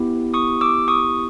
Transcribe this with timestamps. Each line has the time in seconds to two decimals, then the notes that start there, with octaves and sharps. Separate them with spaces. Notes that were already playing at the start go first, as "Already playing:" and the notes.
Already playing: B3 E4 G4
0.34 C#6 D#6
0.61 D6 E6
0.88 C#6 D#6